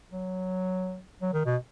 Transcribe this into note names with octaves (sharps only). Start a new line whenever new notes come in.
F#3
F#3
D#3
B2